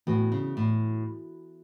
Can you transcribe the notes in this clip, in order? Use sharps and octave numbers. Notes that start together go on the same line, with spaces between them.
A2 E3 B3 F#4
C#3
A2